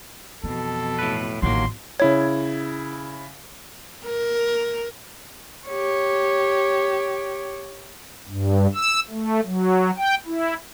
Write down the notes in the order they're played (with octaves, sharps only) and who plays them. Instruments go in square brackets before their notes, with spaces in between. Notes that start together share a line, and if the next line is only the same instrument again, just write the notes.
[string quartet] F2 B2 [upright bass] E3 [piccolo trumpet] A4
[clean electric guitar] A2 B4
[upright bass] A1 [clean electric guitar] D#2 F#3 A#3 [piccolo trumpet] C6
[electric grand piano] C#3 E4 G#6 [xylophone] C#5
[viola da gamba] A#4
[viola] G4 C#5
[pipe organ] G2
E6
A3
F#3
G5
E4